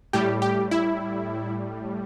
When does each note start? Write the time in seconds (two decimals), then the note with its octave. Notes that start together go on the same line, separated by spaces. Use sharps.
0.13 A2 G3 G4
0.42 G4
0.71 E4